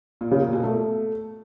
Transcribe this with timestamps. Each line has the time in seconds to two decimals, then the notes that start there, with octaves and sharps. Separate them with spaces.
0.21 A#2
0.31 C#3
0.42 A#2
0.53 B2
0.63 A3